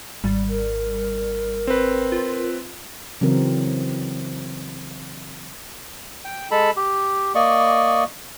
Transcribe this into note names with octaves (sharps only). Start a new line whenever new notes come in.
G#1 G3
A#4
C4 B4
F4
C#3 E3 F#3 C4 A#4
G5
G#3 A4 A5 B5
G4
A#3 D5 D#5 C#6